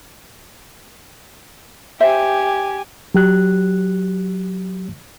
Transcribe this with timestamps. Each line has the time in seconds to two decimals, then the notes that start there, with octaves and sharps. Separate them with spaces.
2.00 G4 C5 E5 G#5
3.15 F#3 G4 F#6